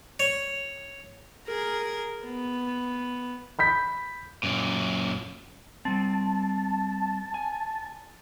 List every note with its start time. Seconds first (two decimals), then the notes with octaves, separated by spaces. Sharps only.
0.20 C#5
1.47 G#4 A#4
2.26 B3
3.59 B5 G6 B6
4.43 F#2 A#2
5.85 G3 C4 A5
7.34 G#5